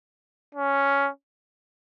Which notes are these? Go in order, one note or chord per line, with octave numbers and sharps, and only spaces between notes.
C#4